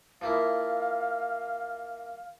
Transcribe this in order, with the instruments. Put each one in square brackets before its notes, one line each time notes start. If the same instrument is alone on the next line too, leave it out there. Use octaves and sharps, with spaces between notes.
[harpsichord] F3 A#3 E4 [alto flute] F5